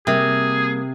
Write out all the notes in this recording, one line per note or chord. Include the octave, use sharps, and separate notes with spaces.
C3 G3 A#3 G#4